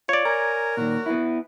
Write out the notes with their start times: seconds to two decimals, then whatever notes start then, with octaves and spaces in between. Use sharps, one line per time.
0.09 F4 C#5 D5
0.25 A#4 G#5 A#5
0.77 A#2 D#3 F#4
1.06 B3 E4